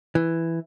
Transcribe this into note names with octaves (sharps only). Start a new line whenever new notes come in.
E3